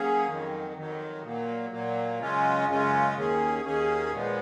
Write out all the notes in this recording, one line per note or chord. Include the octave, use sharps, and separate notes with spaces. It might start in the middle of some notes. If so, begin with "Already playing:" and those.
Already playing: F#3 A#3 C#4 G#4
F2 D#3 F#3
F2 D#3 F#3
A#2 F#3 A#3
A#2 F#3 A#3
F#2 C#3 G#3 C#4 F4
F#2 C#3 G#3 C#4 F4
D#2 D#3 A#3 C#4 G#4
D#2 D#3 A#3 C#4 G#4
A#2 F3 G#3 B3